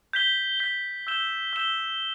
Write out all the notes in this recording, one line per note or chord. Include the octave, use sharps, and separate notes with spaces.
G6 B6 G7
G6 B6 G7
E6 G6 E7 G7
E6 G6 E7 G7